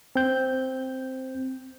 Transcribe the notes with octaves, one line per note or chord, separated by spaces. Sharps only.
C4 G6